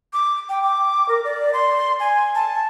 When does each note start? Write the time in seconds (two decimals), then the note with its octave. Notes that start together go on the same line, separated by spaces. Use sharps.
0.13 D6
0.49 G5
0.62 D6
1.09 A#4
1.25 D5
1.53 C6
2.00 G#5
2.35 A5